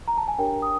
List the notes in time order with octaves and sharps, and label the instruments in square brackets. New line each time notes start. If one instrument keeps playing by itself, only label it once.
[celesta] A#5
A5
G#5
D4 G4 A#4 C#5 G5
D#6